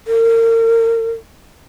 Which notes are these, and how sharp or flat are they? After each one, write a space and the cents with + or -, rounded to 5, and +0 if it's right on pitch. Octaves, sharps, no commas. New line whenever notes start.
A#4 -35